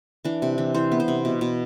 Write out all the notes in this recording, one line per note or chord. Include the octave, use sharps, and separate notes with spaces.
E3 D4
C3
E3
E3 C5
B3
C5
C3
B2
B2